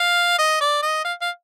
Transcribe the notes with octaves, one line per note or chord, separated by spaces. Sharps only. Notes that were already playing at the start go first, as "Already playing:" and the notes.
Already playing: F5
D#5
D5
D#5
F5
F5